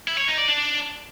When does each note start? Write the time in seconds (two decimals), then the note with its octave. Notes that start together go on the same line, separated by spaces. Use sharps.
0.08 E4
0.18 C#5
0.28 D#4
0.38 D5
0.48 D4